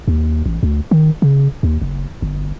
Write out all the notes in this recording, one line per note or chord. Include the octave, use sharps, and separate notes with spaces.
D#2
A1
D2
D#3
C#3
D#2
F#1
G1